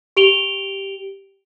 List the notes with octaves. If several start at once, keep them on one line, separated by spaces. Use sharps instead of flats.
G4 D7 F7 G7